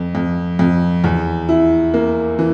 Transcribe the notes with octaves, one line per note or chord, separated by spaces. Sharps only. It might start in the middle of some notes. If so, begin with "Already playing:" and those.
Already playing: F2
F2
F2
E2
E4
A#3
E3